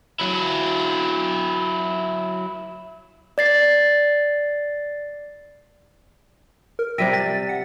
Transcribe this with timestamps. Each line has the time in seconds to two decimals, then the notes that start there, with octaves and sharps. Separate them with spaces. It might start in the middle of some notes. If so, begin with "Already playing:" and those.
0.20 F#3 E4
3.38 D5 A6 C7
6.79 A#4
6.98 C3 G3 E5 G5 A#6 B6 D#7
7.13 A6
7.49 F#5